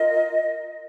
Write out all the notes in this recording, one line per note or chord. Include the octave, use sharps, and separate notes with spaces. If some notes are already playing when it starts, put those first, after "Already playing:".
Already playing: F4 A#4 D#5